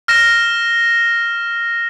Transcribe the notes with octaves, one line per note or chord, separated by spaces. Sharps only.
F6 A#6 E7